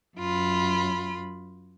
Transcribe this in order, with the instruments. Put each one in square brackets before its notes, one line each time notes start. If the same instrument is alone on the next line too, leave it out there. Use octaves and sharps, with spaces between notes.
[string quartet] F#2 F4 B5